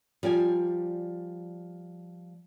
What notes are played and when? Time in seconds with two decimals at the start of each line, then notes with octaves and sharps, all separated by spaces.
0.23 F3 G3 D5 G#5